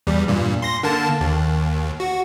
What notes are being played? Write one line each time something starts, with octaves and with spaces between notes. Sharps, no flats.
E2 G3
G2 A#2
C6 A#6
D3 A#3 A5
D#2
F#4